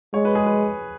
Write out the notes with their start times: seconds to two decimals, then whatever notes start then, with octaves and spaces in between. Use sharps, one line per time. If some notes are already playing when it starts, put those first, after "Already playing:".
0.14 G#3 C#5
0.25 B4
0.35 G#4
0.46 B4